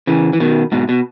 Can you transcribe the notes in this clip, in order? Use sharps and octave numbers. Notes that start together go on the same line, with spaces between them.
C#3 E3
E3
B2 D#3
G#2 B2
B2